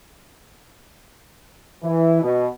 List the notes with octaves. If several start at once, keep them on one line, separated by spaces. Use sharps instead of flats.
E3
B2